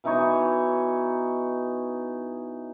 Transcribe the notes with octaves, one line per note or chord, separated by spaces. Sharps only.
B2 E3 D#4 C#5